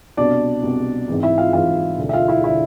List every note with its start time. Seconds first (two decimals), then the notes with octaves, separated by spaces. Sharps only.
0.17 C2 B2 D4 D5
0.63 C2 B2
1.08 G#1 G#2 E3
1.23 E4 E5
1.38 F4 F5
1.53 G#1 G#2 E3 F4 F5
1.98 E1 D2 D3
2.09 E5
2.13 F4 F5
2.28 E4 E5
2.44 D3 E4 E5